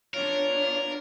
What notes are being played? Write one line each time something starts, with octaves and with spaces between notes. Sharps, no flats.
B3 D4 F4 A#4 C#5